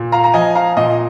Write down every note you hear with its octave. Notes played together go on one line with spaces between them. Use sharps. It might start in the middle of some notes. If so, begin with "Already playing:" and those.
Already playing: A#2
F5 A#5
A#5
F3 D#5 G#5
F5 A#5
A#2 D#5